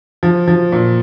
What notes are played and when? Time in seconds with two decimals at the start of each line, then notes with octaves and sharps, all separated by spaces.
0.23 F3
0.47 F3
0.72 A#2